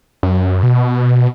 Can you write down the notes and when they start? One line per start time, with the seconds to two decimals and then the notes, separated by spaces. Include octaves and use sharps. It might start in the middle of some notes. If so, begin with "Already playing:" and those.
0.23 F#2
0.63 B2